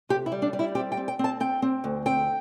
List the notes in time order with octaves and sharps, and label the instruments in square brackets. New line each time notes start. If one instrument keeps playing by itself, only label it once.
[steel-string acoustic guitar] C3 G4
E4
G3
D4
G3
E4
C4 G4
G5
C4
G5
C4 A5
C4 G5
C4
D2
C4 G5